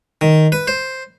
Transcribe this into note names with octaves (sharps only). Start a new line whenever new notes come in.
D#3
B4
C5